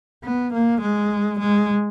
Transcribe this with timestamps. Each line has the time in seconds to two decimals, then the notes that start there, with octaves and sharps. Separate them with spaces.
0.24 B3
0.54 A#3
0.81 G#3
1.39 G#3